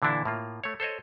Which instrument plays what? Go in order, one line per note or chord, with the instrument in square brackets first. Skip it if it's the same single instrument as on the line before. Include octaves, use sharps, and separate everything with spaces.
[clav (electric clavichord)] A#2 D3 E3 D4 E4
A2 A#3 F4
A3 C#5
A4 C5 C#5 D#5